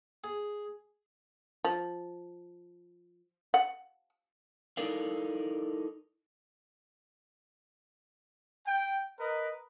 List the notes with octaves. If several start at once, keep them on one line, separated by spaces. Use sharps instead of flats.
G#4
F3
F#5
D#4 E4 A4 A#4 D5 F5
G5
A#4 B4 D#5